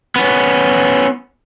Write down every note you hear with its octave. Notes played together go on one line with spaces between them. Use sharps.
B3 C#4